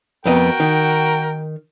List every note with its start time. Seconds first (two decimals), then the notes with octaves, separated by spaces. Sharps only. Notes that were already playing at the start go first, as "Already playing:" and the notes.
0.26 F2 B3 F#4 A#4 D#5 G5
0.60 D#3